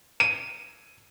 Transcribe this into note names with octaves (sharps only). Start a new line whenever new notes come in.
D#7